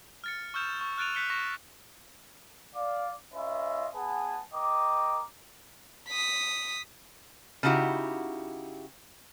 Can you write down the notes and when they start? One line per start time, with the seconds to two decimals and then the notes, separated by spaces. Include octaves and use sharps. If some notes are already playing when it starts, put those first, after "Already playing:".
0.24 F6 A6 C#7
0.54 C#6 E6 F6 G6 E7 F7
0.80 C#6 G6
0.98 F6 F#6 A6 D7 D#7 F7
1.15 F#6 G6 B6 C#7 F7 G7
1.30 C#6 A#6 E7
2.75 D5 F5 D6
3.34 C#4 F4 B4 D#5 E5
3.95 B3 G#4 B4 F#5 G#5 A5
4.54 A#4 D#5 G5 D6
6.09 D#6 B6
7.63 C#3 D#4 E4 F#4 G4